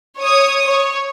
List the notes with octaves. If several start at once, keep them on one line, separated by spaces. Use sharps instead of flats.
C#5 D#6
C#5